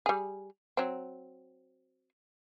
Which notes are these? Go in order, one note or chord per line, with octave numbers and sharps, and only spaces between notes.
G3 G#4
F#3 C4